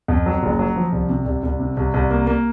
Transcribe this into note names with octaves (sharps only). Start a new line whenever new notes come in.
F2
F#3
F#1
F#3
F3
C2
C3
C2
C2
C3
C2
C2
A#3
A#3